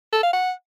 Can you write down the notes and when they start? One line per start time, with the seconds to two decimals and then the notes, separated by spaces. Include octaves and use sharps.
0.13 A4
0.23 F5
0.33 F#5